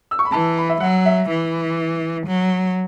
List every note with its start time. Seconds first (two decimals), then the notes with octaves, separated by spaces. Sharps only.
0.11 E6
0.19 C#6
0.25 B5
0.32 E3 A5
0.57 B5
0.69 E5
0.80 F#3 F#5
1.06 E5
1.30 E3
2.27 F#3